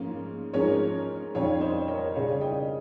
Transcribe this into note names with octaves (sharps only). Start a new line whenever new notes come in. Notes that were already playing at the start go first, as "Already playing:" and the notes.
Already playing: G#2 F3 A#3 C#4
G#2 F3 G#3 C#4 A#4 C#5
F2 D#3 G3 C#4 C#5 F5
C5 D#5
A#4 C#5
C#3 G3 C#4 C#5 F5
D#5 G5